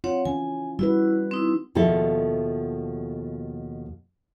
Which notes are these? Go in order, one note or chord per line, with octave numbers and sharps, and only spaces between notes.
C4 F4 C#5 F#5
E3 C#4 G#5
G3 E4 F#4 B4
C4 D#4 E4
D#2 B2 F3 G#3 A4 E5